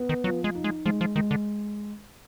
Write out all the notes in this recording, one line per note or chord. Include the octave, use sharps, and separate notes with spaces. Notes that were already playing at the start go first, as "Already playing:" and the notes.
Already playing: B3
D#3
F3 F#3
G#3
D#4
G#3
F3 G#3
F3
D#3 G#3
D3